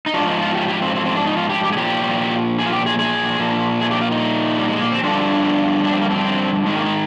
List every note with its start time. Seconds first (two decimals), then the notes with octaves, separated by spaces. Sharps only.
0.06 D#4
0.14 G#2 F3 D4
0.27 D#4
0.41 F4
0.55 G4
0.68 G4
0.82 C4
0.95 C4
1.06 C4
1.16 D4
1.26 D#4
1.37 F4
1.49 G4
1.63 G4
1.72 G#4
1.77 A#2 F3 G4
2.59 G#4
2.66 F4
2.72 G4
2.86 G#4
2.99 G#4
3.40 A#2 F3
3.81 G#4
3.91 G4
4.01 F4
4.11 D#4
4.58 G3
4.69 G#3
4.81 A#3
4.92 C4
5.03 G2 D3 F3 D4
5.84 D4
5.93 C4
6.02 A#3
6.10 C4
6.66 G#2 D#3 G#3
6.77 A#3
6.86 G#3